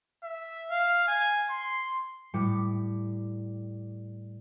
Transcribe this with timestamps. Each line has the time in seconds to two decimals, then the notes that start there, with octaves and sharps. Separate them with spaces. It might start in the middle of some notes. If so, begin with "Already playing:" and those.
0.23 E5
0.71 F5
1.07 G#5
1.50 C6
2.34 A2 G3 D6 C#7